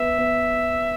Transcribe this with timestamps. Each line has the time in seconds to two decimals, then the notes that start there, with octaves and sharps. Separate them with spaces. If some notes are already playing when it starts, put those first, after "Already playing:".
Already playing: B3 E5
0.18 B3